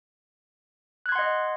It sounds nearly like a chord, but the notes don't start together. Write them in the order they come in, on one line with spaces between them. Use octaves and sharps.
F#6 G#6 C6 F#5 D#5